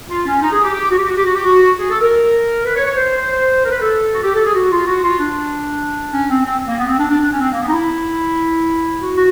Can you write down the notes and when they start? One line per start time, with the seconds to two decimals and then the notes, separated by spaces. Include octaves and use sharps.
0.09 F4
0.26 C#4
0.41 D#4
0.52 G#4
0.64 G4
0.74 G4
0.90 F#4
0.98 G4
1.07 F#4
1.17 G4
1.25 F#4
1.35 G4
1.44 F#4
1.79 G#4
1.90 A4
2.01 A#4
2.64 B4
2.75 C#5
2.85 C#5
2.96 C5
3.65 A#4
3.70 B4
3.81 A4
4.14 F#4
4.23 G4
4.34 A4
4.44 G#4
4.54 F#4
4.71 F4
4.87 F#4
5.03 F4
5.18 D4
6.13 C#4
6.30 C4
6.45 C4
6.67 A#3
6.78 B3
6.87 C4
6.98 D4
7.09 D4
7.20 D4
7.31 C#4
7.40 C4
7.52 A#3
7.61 B3
7.67 D#4
7.72 E4
9.00 F#4
9.16 F#4